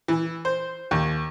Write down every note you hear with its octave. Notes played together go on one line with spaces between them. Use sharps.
E3
C5
D#2